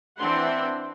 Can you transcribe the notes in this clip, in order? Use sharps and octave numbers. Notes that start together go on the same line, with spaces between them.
E3 C4 D4 E5 F#5 C6